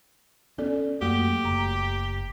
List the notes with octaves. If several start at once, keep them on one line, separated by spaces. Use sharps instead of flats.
B3 C#4 A4 D5
F#2 A3 A#3 F#4 G4
F#1 A#5